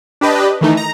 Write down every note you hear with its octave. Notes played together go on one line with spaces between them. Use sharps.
D4 G4 B4 D#5
D#3 E3 A3 D#4
A#5